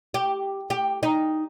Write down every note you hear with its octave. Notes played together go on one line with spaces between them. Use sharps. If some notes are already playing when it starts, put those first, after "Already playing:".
G4
G4
D#4